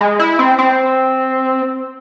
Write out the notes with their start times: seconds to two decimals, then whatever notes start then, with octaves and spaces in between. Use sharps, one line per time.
0.01 G#3
0.19 E4
0.39 C4
0.58 C4